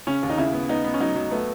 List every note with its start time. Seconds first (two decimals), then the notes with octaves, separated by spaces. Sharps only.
0.07 C#3 C#4
0.23 D#2
0.30 D#4
0.38 C#3 E4
0.53 B3
0.69 B3 D#4
0.84 B3
0.94 C#4
1.00 F#3 D#4
1.16 F#3
1.31 A3 B3